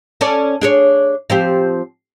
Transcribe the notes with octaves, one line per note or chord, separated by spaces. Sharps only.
C#4 A4 D5
D4 G#4 C#5
F3 C4 G4